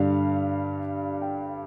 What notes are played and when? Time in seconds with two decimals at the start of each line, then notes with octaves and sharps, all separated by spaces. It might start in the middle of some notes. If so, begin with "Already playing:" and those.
Already playing: G2 D3 G3 F5
1.22 G5